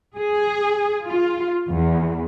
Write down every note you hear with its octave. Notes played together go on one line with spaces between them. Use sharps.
G#4
F4
E2